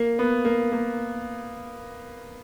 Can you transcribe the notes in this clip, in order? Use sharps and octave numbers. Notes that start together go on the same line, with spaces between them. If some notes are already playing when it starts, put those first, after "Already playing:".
Already playing: A#3
B3
A#3
A#3